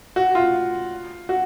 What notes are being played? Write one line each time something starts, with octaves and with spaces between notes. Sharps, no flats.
F#4
F4
F#4